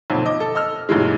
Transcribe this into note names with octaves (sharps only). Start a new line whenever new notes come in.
B1 F2 A#2 D3
D#5 D6
A4
D#5 E6 F6
B1 G2 A#2 E3 G#3